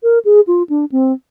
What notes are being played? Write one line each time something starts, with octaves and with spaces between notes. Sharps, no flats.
A#4
G#4
F4
D4
C4